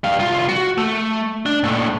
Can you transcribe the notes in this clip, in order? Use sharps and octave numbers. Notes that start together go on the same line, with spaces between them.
G3 F5
C2 F4
F#4
A3
D4
A#2 A3